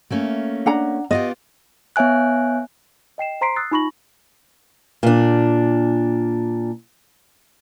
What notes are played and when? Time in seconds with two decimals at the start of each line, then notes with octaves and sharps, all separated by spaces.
0.10 A3 A#3 C#4
0.66 D4 F#5 A#5
1.11 B3 F4 G4 D#5
1.96 B3 C#5 E5 G#5 F#6
3.18 D#5 G5 C7 E7
3.41 C5 A#5 C6 B6 C7 D7
3.56 D#6 E6 F#6 A6 C7
3.71 D#4 F4 B5 C#6 A#6 F#7
5.03 A#2 D4